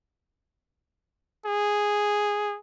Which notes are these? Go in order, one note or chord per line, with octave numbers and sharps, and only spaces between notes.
G#4